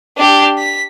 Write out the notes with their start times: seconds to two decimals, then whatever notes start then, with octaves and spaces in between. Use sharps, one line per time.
0.17 D4 G4
0.58 B6